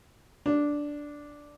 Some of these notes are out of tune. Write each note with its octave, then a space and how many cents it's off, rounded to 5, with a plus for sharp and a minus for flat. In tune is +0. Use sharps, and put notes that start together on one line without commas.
D4 -5